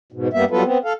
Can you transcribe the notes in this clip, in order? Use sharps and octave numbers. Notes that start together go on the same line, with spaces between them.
G#2 B2
G2 G3 A#3 B3 E5
F#3 G3 B3 F4 A4 B4
B3 C4
A4 F5